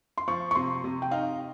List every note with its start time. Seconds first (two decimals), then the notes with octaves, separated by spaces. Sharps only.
0.18 C6
0.28 F3 C#6
0.51 C#6
0.55 C3 C6
0.84 C3
1.02 G5
1.11 D#4 F5